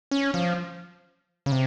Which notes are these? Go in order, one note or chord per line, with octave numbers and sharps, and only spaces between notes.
C#4
F3
C#3
C3